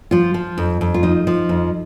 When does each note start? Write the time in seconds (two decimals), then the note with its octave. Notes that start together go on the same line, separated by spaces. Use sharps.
0.11 F3 F4
0.34 F3
0.58 F2
0.81 F2
0.94 F4
1.03 F3 D#4
1.27 F3
1.49 F2